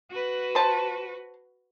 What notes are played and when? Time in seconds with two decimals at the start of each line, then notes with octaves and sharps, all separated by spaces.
0.11 F#4 B4
0.55 C5 A5